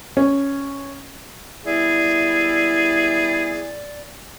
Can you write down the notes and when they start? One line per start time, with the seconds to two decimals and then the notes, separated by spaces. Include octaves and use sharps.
0.17 C#4
1.66 G3 B3 E4 G#4 D5